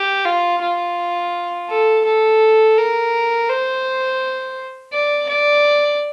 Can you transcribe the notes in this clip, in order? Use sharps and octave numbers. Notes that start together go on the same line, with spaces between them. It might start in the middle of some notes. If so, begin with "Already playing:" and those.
Already playing: G4
F4
F4
A4
A4
A#4
C5
D5
D5